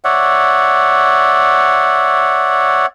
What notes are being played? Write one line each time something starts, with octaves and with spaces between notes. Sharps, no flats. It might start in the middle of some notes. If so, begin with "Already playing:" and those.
C#5 D5 E5 F#5